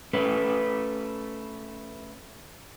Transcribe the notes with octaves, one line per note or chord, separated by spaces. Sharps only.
A3 C#4 B4